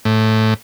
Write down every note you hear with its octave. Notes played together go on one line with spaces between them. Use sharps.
A2